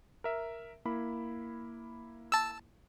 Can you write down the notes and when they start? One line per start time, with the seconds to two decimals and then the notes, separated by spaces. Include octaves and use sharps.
0.24 A#4 E5
0.85 A#3 E4 B5
2.32 A5 E6